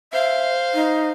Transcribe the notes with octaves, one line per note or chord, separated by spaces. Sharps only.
C5 E5 F5
D#4